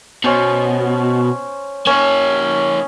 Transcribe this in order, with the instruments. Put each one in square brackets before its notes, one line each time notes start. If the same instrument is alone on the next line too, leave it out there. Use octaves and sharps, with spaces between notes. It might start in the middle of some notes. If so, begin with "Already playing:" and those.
[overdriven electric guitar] B2 [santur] C#4 C5
[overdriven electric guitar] A#3 C#5 [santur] C#4